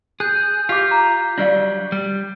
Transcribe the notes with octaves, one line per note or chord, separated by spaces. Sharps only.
G#4 F#6 G6
F4 G4 F5 D6 G6 B6 C7
A#5
F#3 G3 D4 F4 D5 F5
G3